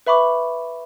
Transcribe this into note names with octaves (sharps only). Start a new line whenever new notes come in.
B4 E5 B5 C#6 D6